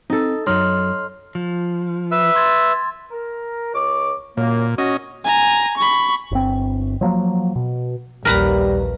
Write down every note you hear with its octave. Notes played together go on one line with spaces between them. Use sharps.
C4 D#4 A4
F#2 F#3 D#4 A4 C#5 C6 F6
F3
B4 E5 E6
C6 G#6 A6
A#4
C#2 C#6 D6
F#2 A#2 A#3
C#4 F#4 D#5
G#5 A#5
B5 C#6
G1 C4
F3 F#3 A#3
B2
A#1 D#2 G3 A#4 B4 A#5